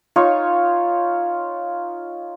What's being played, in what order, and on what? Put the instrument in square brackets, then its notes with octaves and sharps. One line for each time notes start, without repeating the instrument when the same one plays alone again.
[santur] D#4 F4 C#5